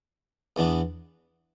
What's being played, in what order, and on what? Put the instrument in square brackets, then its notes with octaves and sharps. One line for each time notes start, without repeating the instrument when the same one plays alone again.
[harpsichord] E2 E3 B3 D4